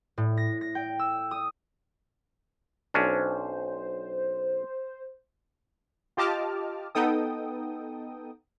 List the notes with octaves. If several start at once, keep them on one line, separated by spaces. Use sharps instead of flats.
A2
A#6
A#6
G5
E6
D#6
B1 C#4 D4 C5
F4 G4 D#5 A5 D6 F6
B3 D#4 A4 G5 D#6